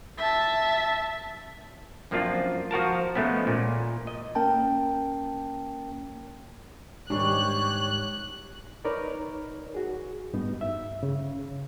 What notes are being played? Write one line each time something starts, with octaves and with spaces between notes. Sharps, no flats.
E5 A5
F#2 F3 A#3 C4 D4 F4
F3 F#4 A#4 A5
F3 G#3 A3 B3 C#4
A#2
D#5
A#3 C#4 A#4 G5 A5
G#2 D#3 G3 D4 G4 C#5 C#6 F#6
D#4 A#4 B4 C#5 D5
F#4 G#4
G2 B3 D#4
G2 E5
C#3